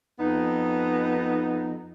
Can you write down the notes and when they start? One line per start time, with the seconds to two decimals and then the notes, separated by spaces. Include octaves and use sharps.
0.20 F2 B3 D#4